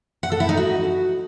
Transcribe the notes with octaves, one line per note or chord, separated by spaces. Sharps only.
F#5
A4
E4
D#4
F#4